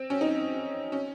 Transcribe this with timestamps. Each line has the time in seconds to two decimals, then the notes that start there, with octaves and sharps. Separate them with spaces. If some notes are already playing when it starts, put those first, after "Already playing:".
Already playing: C4
0.10 C#4
0.21 D#4
0.92 C#4